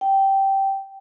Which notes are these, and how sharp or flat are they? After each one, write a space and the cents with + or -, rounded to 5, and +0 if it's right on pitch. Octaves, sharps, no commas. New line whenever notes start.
G5 -10